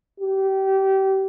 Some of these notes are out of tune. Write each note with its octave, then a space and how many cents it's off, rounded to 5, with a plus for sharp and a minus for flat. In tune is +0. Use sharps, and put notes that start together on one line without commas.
G4 -25